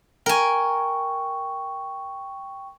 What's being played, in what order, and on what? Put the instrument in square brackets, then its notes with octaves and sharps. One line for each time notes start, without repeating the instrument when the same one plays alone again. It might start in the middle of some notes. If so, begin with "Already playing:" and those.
[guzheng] A#4 G#5 [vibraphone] G5 C#6